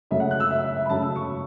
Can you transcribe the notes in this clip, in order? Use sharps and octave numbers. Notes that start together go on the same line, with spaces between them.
F#2 C#3 F#3 A3 E5
F#5
F#6
E6
E5
E5
E5
B5
F#2 C#3 F#3 A3 A5
E6
C#6